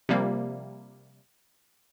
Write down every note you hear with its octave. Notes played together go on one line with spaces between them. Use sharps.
C3 F3 G3 A#3